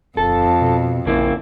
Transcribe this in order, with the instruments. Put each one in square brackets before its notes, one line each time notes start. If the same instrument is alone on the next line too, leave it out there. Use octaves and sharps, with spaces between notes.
[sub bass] D#1 [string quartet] F2 [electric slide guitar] A4
[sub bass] B2
[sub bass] A#1 [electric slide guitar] C#3 A#3 E4